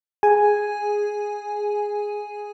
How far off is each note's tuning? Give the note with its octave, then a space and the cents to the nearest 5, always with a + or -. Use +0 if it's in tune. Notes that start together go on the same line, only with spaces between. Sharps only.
G#4 +0 G#5 +0